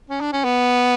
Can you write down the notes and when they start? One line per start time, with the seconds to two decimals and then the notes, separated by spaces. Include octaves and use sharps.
0.10 C#4
0.21 D4
0.33 C#4
0.44 B3